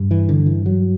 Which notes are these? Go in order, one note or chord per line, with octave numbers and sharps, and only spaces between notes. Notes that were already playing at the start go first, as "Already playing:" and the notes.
Already playing: G2
E3
D3
E3
F#3